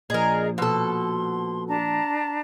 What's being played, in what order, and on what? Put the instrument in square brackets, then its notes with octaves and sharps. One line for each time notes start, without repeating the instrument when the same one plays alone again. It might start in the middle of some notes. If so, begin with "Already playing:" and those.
[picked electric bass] A#2 F3 [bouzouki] G#4 A#4 [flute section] D5 D#5
[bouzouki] B2 A4 [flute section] C6
[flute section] D4 A5 A#5